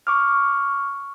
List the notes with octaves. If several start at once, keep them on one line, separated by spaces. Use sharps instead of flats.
C#6 D6 F6